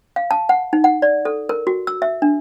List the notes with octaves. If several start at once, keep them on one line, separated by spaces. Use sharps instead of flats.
F5
A5
F#5
D#4
F#5
D5
A4
A#4
F#4
E6
E5
D4